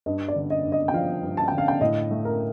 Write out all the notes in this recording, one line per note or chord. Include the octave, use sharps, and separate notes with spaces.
G2 D#5
D5
D3
D#5
G2
D#5
G5
F3 F5
G2
A5
D3 G5
F5
G5
A2 D#5
A3
A#4